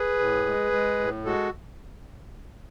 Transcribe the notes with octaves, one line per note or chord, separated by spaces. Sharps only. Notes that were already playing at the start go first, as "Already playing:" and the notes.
Already playing: G#4 B4
A2
G#3
G#3
A2
G#3 F#4 A4